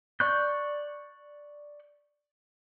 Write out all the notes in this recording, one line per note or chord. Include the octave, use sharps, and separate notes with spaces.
D5 C#6 F#6 G6